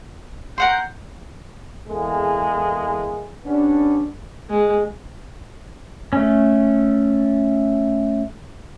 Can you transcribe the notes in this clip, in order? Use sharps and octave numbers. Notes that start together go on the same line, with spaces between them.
A#4 F#5 C6 G6
E2 G#3 A#3 E4 G#4 A4
D#3 G3 B3 C#4 D4
G#3
A3 C#4